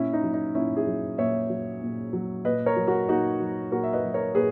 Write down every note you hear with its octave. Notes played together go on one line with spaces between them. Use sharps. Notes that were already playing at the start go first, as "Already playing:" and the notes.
Already playing: A#2 C#4 E4
D#4
F#3
D#4
A#2 C#4 E4
E4 G#4
F#3
A#2 C#5 E5
F#3
A#2
F#3
A#2 B4 D#5
A#4 C#5
F#3
F#4 A#4
A#2 D#4 F#4
F#3
A#2 F#4 A#4
E5
B4 D#5
F#3
A#4 C#5
A#2 G#4 B4